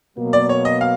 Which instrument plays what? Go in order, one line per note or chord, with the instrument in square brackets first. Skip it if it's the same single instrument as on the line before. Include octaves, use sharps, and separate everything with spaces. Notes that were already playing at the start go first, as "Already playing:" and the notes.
[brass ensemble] B2 F#3 A#3
[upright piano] D5
C#5
D#5
F5